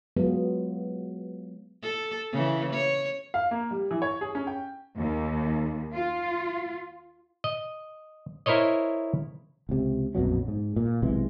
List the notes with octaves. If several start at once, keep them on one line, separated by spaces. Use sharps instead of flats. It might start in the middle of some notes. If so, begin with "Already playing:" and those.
F#3 G#3 B3 F4
A4
C#3 E3
C#5
F5
A#3
G3
E3
C#5
G#4
C#4
G5
D#2
F4
D#5
E4 A#4 C5 C#5 D#5
C#2 C3
A#1 F2 B2 F#3
G#2
A#2
B1 C3 E3 G#3